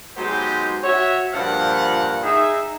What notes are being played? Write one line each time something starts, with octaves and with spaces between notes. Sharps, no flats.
F#3 G#3 B3 D#4 G4 C5
F#4 C#5 E5
G2 A#2 F3 F5 F#5
D#4 G#4 E5